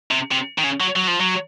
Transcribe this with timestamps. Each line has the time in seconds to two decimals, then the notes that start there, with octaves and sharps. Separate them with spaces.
0.11 C3
0.32 C3
0.59 D#3
0.64 C#3
0.80 F#3
0.96 F#3
1.08 F3
1.20 F#3